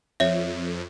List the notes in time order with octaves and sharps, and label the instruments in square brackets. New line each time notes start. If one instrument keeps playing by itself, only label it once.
[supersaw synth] F2 [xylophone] C#5 E5